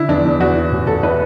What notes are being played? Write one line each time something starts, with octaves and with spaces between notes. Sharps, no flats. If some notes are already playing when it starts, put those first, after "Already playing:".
Already playing: D3 E4
E2 D4
E2
E2 F#4
E3
A1
A1 A4
A2 B4